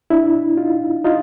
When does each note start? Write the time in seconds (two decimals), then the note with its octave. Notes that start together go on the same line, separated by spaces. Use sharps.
0.10 D4 E4
0.57 D#4 F4
1.04 D#4 F4